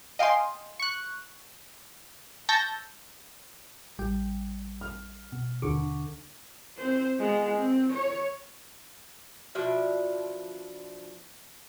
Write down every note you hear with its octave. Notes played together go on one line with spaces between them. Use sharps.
D#5 F5 G5 G#5 C6
C#6 F#6
A5 C#6 E6 G6 A#6
A1 G3 G5
F6
B2
D#2 D3 C#6 D6
C4 C5
G#3 B3
C4
C#5
B2 F3 D4 E5